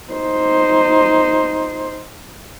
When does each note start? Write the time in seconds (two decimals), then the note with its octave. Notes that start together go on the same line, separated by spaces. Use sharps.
0.13 D#4 C5